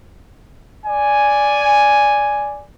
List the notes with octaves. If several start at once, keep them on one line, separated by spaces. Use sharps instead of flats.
D5 G#5